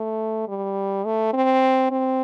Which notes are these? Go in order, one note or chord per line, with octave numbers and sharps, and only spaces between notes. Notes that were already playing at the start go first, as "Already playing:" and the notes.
Already playing: A3
G3
A3
C4
C4